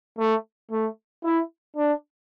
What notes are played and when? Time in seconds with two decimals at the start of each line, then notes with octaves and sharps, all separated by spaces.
0.19 A3
0.71 A3
1.24 E4
1.77 D4